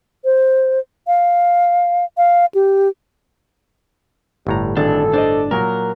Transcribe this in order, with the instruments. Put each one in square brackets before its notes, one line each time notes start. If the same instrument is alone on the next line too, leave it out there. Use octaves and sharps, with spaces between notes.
[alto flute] C5
F5
F5
G4
[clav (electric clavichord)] G1 A2 A#5 [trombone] G3
[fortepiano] G#1 [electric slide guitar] D4 [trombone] A4
[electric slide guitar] D4 [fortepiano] C5 D5 D#5
[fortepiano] A#2 F#3 [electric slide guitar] A#4